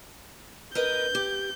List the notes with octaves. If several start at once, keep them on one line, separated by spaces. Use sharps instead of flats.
A#4 B4 D#5 G6
G4